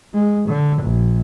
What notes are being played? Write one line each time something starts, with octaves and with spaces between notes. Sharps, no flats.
G#3
D3
A#1